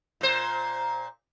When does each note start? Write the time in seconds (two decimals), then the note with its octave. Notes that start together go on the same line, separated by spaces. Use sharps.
0.21 A#2 C5